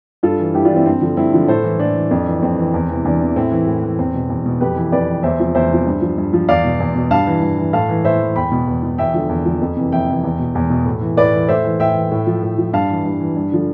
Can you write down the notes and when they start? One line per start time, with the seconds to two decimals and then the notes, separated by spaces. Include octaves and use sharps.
0.23 G2 F4 A4
0.39 E3
0.54 G2 E4 G4
0.65 D4 F4
0.70 E3
0.76 C4 E4
0.86 G2 C4
1.01 D3 F3
1.17 G2 C4 E4
1.33 D3 F3
1.48 A2 A4 C5
1.64 E3
1.79 A2 D4
1.96 E3
2.11 F2
2.26 E3
2.42 F2 C4
2.58 E3
2.74 E2
2.89 C3 E3
3.05 E2 D4
3.20 C3 E3
3.36 A2 C4 E4
3.52 E3
3.67 A2
3.83 E3
3.98 E2 C4
4.15 B2
4.30 E2
4.45 B2
4.61 F2 G4 B4
4.76 E3
4.92 F2 B4 D5
5.08 E3
5.23 E2 C5 E5
5.39 C3 F3
5.55 E2 C5 E5
5.71 C3 F3
5.86 G2
6.02 F3
6.18 G2
6.33 F3
6.49 E2 D5 F5
6.64 B2
6.80 E2
6.95 B2
7.11 G2 F5 A5
7.27 E3
7.42 G2
7.58 E3
7.73 A2 F5 A5
7.89 E3
8.05 A2 C5 E5
8.20 E3
8.36 E2 G5 B5
8.52 B2
8.68 E2
8.83 B2
8.98 E2 E5 G5
9.14 D3 F3
9.29 E2
9.45 D3 F3
9.61 F2
9.77 C3 E3
9.92 F2 E5 G5
10.08 C3 E3
10.24 E2
10.39 B2
10.55 E2
10.70 B2
10.85 A2
11.01 E3
11.17 A2 B4 D5
11.33 E3
11.48 A2 C5 E5
11.64 E3
11.80 A2 E5 G5
11.95 E3
12.12 A2
12.27 F3
12.43 A2
12.58 F3
12.73 G2 F5 A5
12.90 E3
13.05 G2
13.20 E3
13.36 G2
13.52 D3 F3